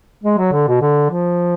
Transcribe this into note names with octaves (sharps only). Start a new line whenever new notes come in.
G#3
F#3
D3
B2
D3
F3